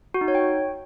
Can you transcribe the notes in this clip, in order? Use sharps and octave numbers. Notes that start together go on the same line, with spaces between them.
F#4
D#4
C#5
G5